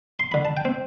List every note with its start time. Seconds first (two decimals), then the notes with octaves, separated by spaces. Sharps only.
0.19 C6
0.32 D3 B5
0.45 A5
0.57 G5
0.65 C4